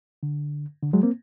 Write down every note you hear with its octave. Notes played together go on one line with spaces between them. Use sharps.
D3
D3
F#3 G#3
A#3 C4